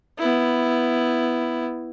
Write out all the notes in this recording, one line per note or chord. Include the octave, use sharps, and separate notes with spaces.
B3 E4